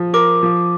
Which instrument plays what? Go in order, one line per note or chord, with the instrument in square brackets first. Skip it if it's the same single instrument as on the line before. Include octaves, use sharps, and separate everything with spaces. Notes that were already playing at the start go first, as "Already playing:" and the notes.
Already playing: [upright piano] F3
[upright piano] A#4 [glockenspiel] D6
[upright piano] F3